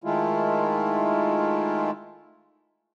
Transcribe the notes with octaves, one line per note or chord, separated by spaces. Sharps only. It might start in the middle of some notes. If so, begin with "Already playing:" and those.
D#3 G#3 A3 E4 F4